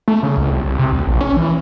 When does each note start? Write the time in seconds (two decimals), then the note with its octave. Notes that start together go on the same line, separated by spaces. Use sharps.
0.08 A3
0.23 C#3
0.37 C#2
0.52 C2
0.65 C2
0.79 C3
0.92 D2
1.07 A#1
1.21 C#4
1.37 E3